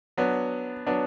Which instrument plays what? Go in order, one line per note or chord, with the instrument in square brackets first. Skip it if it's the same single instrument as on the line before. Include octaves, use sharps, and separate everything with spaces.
[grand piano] F#3 B3 D4
F#3 B3 D4